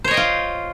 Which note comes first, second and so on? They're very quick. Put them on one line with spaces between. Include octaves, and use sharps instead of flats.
C5 C#5 D#5 G5 F4